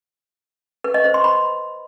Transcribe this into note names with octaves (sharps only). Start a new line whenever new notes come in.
B4
D#5
C5
C6
B5